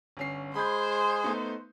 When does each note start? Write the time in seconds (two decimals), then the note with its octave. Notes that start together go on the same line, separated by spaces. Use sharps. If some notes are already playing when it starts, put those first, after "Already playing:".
0.17 G1 C#4 C7
0.55 G#3 G#4 C5 B5 G6
1.24 A3 B3 D#4